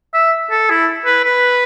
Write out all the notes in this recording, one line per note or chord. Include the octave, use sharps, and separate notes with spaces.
E5
A4
E4
B4
B4